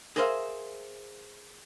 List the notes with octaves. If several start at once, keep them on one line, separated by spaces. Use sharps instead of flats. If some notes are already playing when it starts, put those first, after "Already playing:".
G#4 A#4 C5 D5 E5 F5